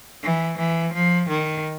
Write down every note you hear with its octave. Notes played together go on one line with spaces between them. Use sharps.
E3
E3
F3
D#3